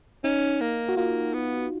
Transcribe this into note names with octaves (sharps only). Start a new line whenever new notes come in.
C#4 D#4
A#3
F#4
A#3 F4
B3